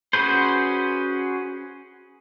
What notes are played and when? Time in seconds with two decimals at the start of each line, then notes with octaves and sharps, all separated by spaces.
0.13 C#4 F#4 G#4 B4 C5